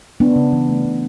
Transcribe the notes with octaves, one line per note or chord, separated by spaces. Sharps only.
C#3 B3 D4
C#3
E3
A3
C#3